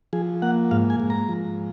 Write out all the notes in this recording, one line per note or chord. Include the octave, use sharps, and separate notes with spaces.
F3 G#4
A#3 F#5
G#2 F5
G#5
G#2
A#5
F3